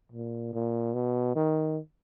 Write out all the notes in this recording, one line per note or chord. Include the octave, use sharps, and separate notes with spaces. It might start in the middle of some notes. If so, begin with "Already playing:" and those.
A#2
A#2
B2
D#3